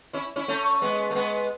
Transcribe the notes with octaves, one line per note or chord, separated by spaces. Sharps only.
C#4 E4
C#4 E4
A3 C#4
G#3 B3
A3
G#3 B3